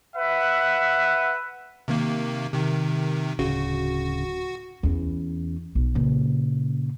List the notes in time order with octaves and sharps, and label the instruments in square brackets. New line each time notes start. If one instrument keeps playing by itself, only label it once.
[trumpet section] B4 E5 F#5
[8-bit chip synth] C3 D#3 A#3
C3 D#3
[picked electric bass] D1 A#1 C#3 [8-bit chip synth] F#4
[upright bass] E2 C#4
B1
A#2 C#3